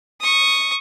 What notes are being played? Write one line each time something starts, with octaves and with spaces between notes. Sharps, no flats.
C#6 D#6